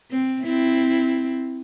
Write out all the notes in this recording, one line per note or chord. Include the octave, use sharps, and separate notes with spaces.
C4
C4 E4